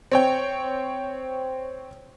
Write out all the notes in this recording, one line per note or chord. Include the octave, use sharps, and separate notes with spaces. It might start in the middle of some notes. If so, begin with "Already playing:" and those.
C4 C#5 G5